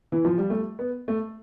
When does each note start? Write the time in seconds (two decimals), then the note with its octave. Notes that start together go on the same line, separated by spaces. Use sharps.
0.12 E3
0.25 F3
0.38 G3
0.50 A3
0.79 B3
1.08 A3